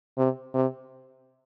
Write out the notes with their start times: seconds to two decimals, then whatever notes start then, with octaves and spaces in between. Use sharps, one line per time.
0.17 C3
0.54 C3